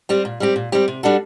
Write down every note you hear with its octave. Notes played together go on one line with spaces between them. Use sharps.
G3 C4 G4
A#2
G3 C4 G4
A#2
G3 C4 G4
C3
G3 D4 F#4 A4